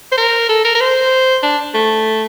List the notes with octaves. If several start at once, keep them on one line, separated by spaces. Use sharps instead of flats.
C5
A#4
A4
A#4
A#4
C5
D4
A3